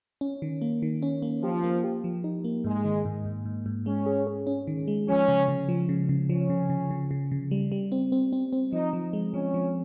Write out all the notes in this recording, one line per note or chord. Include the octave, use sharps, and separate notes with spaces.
C#4
D#3
A#3
D#3
C#4
A#3
F3 G4
A#3
G4
F3
D#4
A#3
G#2 G#3
D#3
G#2
G#2
G#2
G#2
G#3 C#4
G#4
G#4
C#4
D#3
G#3
F3 C#4
C#3
C#3
F3
C#3
C#3
F3 C#4
C#3
C#3
C#3
C#3
C#3
G3
G3
C4
C4
C4
C4
F3 D#4
F3
G#3
F3 C#4
F3